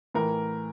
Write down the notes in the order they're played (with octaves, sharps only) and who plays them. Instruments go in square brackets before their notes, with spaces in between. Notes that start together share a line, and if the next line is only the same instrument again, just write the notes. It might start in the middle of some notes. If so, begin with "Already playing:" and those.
[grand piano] A2 E3 A#4